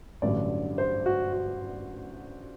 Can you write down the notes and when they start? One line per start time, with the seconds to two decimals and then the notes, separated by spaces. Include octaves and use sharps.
0.22 A1 G2 D3 F#3 D5
0.78 C5
1.06 F#4
1.33 F#4